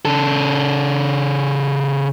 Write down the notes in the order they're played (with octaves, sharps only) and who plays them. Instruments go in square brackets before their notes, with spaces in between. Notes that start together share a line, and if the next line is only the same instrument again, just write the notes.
[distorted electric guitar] C#3 A4